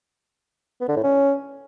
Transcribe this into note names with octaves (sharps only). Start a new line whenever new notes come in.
B3
D3
A2
C#4